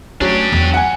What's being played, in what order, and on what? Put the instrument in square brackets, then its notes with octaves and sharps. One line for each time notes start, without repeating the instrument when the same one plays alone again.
[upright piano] F#3 C#4 [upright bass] A3 [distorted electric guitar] D4 G4
[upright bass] E2 G#3
[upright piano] F#5 G#5